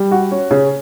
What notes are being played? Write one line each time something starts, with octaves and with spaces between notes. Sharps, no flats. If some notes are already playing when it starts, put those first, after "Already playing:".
Already playing: G3
F#4
C#4
C#3